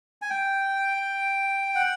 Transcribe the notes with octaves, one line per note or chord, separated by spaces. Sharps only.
G#5
G5
F#5